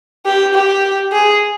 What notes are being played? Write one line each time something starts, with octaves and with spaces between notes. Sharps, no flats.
G4
G4
G#4